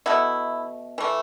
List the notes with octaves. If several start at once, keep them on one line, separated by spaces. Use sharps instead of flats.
B2 A3 E4
E3 A3